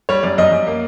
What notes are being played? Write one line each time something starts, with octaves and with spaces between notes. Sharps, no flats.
G3 C#5
F#2 D5
F#2 D#5
F#2
A#3